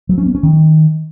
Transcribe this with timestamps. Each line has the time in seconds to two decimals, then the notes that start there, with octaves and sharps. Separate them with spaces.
0.09 F#3
0.18 C#4
0.26 B3
0.35 C#4
0.43 D#3